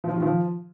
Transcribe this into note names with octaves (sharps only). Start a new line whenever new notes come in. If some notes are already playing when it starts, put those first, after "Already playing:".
F3
F4
D#3
F3